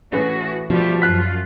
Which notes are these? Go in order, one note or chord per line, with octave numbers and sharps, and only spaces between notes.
A2 E3 C#4 F#4 G#4 B4
B2 F3 G3 A3 G4
F#2 F4 F6 F#6 B6